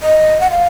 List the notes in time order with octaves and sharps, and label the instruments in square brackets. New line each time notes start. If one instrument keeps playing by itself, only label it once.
[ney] D#5
F#5
F5